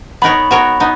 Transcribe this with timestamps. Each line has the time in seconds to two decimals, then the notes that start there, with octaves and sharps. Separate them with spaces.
0.22 B3 D#4 A#4 C#5 B5
0.51 B3 F#4 A#4 C#5
0.80 B3 D#4